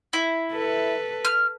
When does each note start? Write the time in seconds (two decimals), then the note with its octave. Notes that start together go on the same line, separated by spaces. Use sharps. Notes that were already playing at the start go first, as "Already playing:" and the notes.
0.13 E4
0.53 A4 B4
1.25 F6